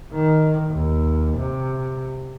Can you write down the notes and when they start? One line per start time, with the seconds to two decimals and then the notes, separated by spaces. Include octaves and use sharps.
0.12 D#3
0.69 D#2
1.37 C3